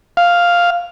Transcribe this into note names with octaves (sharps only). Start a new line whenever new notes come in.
F5